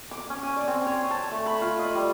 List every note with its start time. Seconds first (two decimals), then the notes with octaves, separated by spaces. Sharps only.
0.11 D6
0.30 C#4
0.43 G#5
0.56 D5
0.68 C4
0.87 C#5
1.11 A5
1.31 A3
1.46 B5
1.61 F4
1.79 D#5
1.95 G3